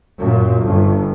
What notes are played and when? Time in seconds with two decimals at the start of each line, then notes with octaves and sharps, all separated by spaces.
0.18 F#2 A#2
0.60 G1